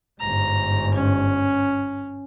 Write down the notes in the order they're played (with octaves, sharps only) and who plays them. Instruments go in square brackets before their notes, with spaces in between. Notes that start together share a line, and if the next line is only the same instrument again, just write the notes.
[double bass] G1 G#2 [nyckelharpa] A#5
[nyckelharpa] C#4